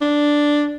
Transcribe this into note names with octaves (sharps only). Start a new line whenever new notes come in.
D4